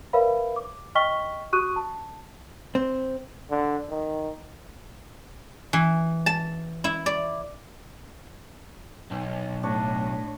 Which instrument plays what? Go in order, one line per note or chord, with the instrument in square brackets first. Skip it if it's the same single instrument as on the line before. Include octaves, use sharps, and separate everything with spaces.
[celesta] A#4 B4 C#5 E5 F5 B5
D6
D#5 G5 C#6 F6 B6 G7
F#4 G4 C#6 D#6 F#6 D#7
A5
[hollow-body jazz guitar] C4
[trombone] D3
D#3
[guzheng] E3
A5
E4
D5
[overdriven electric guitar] B1
[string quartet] A2 [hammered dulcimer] D4 C#5